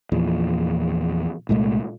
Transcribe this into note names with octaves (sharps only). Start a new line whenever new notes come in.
E2 A#2 F3
C2 A#2 G#3 A3